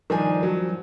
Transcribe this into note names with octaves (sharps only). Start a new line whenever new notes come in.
G2 D#3 F3 D4 D#4 G#5
F#3